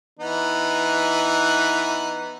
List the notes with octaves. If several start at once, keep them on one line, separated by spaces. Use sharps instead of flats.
E3 B3 D#4